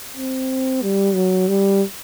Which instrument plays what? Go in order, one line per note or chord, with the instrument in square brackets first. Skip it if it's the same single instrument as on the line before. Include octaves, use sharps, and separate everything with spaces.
[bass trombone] C4
G3
F#3
G3